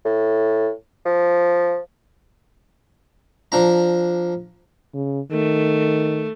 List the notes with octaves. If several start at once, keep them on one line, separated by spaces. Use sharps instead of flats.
A2
F3
F3 D4 A#5
C#3
D#3 A3